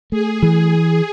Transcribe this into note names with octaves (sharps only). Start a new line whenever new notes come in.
A3 G#4
E3